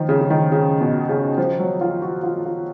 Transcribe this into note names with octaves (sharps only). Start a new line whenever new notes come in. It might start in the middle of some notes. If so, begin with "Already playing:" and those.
Already playing: D#3 F3
C#3
C#3
D#3
C#3
B2
C#3
F3
F#3
F4
F#4
F4
F4